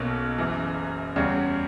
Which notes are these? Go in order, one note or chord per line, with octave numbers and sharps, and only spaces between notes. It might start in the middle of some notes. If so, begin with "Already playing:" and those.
Already playing: B1 B2 A#3 C#4
F#1 F#2 E3
E2 C#3 G3 C#4 F#4